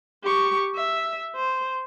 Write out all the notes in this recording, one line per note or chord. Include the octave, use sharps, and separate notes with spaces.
G4 C#6
E5
C5